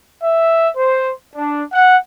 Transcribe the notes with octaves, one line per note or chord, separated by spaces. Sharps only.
E5
C5
D4
F#5